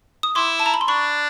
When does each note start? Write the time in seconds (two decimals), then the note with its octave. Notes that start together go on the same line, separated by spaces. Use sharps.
0.23 D#6
0.35 E4 C6 D6
0.60 A5
0.66 A#5
0.74 B5
0.81 C6
0.88 D4 B5 C#6